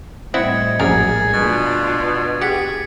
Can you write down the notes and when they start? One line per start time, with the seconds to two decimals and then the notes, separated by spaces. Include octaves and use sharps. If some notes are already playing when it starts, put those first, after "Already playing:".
0.34 A2 G3 C4 E4 D#5 F#5 G#6 C#7
0.79 A#1 F#2 G#4 A#4 G#6 A6
1.34 B2 D4 F4 A6
2.42 G4 G#4 F#5 B6 C#7